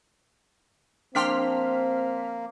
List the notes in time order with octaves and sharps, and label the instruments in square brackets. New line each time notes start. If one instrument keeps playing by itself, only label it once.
[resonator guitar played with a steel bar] F3 D4 G5 [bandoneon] A#3 [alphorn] C4 [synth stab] C6 F6 B6